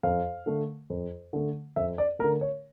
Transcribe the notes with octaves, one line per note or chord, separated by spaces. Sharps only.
F2 F5
D3 A3
F2
D3 A3
F2 E5
D5
D3 A3 A#4
C#5